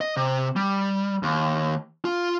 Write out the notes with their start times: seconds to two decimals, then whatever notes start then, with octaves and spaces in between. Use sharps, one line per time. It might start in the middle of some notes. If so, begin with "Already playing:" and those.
0.01 D#5
0.17 C3
0.56 G3
1.23 D#2
2.05 F4